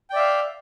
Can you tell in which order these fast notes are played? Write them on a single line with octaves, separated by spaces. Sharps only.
G5 D5 E5 F5